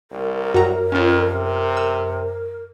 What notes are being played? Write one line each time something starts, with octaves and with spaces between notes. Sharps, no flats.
C2 A#4
F#2 F#4 G4 A#5
F2 C#4 F4
C3
E6